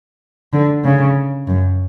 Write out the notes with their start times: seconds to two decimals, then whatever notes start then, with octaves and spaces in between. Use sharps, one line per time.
0.53 D3
0.84 C#3
1.47 F#2